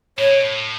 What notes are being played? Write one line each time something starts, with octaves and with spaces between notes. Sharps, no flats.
A2 C#5
B2
A2